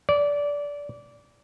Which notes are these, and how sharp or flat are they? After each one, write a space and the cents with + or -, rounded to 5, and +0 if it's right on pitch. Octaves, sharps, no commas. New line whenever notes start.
D5 -20